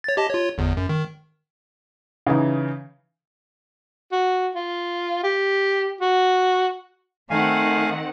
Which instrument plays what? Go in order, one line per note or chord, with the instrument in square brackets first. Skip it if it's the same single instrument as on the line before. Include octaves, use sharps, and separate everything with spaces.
[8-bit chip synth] C#5 A6
G4 D#5 A5
F4 C#5
G1 E2
F#2
D#3
[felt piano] C#3 E3 D#4
[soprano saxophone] F#4
F4
G4
F#4
[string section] D#3 C4 F#5 [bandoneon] A3 F5 G#5